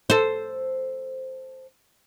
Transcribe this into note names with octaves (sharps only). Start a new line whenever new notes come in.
A4 C5